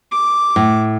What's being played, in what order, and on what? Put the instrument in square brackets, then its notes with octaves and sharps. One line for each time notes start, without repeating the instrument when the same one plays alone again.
[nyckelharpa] D6
[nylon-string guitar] A2